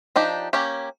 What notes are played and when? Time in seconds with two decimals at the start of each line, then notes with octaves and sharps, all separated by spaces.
0.16 F3 D4 D#4 G4
0.53 A#3 C#4 G4